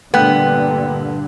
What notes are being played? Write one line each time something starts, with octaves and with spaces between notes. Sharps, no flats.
G2 A#2 D3 A3 B3 G5 F#6